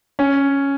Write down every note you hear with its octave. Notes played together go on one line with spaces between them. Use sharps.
C#4